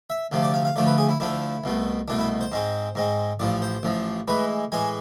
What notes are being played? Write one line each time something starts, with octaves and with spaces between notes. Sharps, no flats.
E5
D2 C3 F3 A3
D5
F5
F5
D2 D3 F3 A3 D5
B4
G#4
E4
D2 D3 F3 A3 E4
C2 B2 A3
C2 B2 A3 D4
E4
C5
G#2 G#3 C4
G#2 G#3 C4
A1 A2 F3 D5
C5
A1 A2 F3
A2 E3 G#3 B4
A2 E3 G#3 G#5